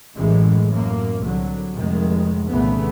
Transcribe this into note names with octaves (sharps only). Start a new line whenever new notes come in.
A1 F#2 A2 E3 G#3
F#2 A2 A#3
C2 D3 F#3
F1 D#3 G#3
C2 A#2 C#3 E3 A3 B3